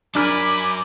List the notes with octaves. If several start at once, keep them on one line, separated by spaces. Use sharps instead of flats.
F#3 D4 A#4 G#5 B5 D6 F6